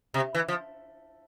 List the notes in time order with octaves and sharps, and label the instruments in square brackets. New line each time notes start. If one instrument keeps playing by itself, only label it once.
[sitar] C3
E3
F3